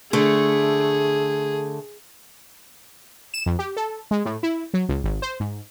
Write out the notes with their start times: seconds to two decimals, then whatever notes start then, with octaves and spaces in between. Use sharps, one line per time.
0.13 D3 A3 G#4
3.34 E7
3.46 F2
3.59 G4
3.77 A4
4.11 G#3
4.25 A2
4.43 E4
4.74 F#3
4.89 C#2
5.04 G#1
5.22 C5
5.40 G#2